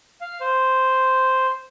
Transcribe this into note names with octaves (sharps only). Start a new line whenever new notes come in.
F5
C5